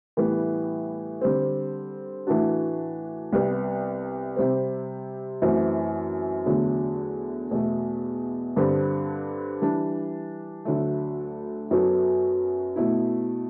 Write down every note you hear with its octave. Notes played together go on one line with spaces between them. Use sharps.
A2 E3 G3 B3
D3 G3 C4
A2 E3 A3 D4 F#4
C2 C3 G3 B3
C3 G3 C4
F#2 E3 A3 C4 F#4
E2 D3 F#3 A3
E2 B2 A3
G2 D3 G3 C4 G4
E3 G3 D4
D2 D3 F#3 A3
F#2 F#3 B3 F#4 A4
B2 A3 E4